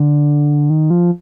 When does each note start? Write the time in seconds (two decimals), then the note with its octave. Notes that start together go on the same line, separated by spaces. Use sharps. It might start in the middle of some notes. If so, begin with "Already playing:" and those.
Already playing: D3
0.70 D#3
0.90 F3